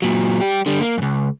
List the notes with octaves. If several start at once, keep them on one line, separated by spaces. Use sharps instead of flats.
A#2 F#3
G3 G4
D3 G3
A#3
C#2 F#2